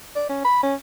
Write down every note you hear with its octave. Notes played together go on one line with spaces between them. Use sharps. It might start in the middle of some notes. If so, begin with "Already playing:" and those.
D5
C#4
B5
C#4